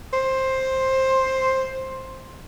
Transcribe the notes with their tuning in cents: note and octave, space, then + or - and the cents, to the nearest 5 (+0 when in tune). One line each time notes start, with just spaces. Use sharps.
C5 +10